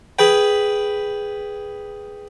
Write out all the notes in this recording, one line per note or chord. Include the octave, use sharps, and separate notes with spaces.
G#4 B4 G5